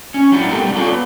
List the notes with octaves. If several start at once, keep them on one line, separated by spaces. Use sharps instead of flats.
C#4
F#3 C4 D4 E4 F#4
B3 D#4 G4 A4 A#4
G3 A#3 C4
F4 G#4 A4 C#5 D5
B3